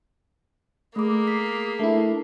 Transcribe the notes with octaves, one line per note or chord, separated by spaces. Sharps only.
A3 A#3 G#4 D6
B6 C7
A3 D4 E4